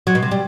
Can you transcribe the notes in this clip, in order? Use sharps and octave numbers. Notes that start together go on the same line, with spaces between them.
F#3
B2
C3
G3